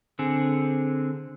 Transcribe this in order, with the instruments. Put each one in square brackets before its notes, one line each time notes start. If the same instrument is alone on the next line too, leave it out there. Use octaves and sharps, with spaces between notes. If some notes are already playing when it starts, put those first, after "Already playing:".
[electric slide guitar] D3 C4 G#4